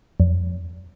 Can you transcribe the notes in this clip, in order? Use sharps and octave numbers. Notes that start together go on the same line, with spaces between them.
F2